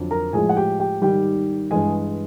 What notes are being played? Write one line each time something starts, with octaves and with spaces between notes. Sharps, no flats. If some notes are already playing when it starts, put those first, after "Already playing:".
Already playing: F2 D3 F#3
A#4 A#5
A2 F3 G#3 G#4 G#5
F#5
G4 G5
G4 G5
G#2 D#3 G3 G4 G5
G2 E3 G#3 G#4 G#5